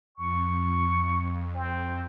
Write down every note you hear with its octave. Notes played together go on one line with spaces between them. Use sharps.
F2 C#6
C4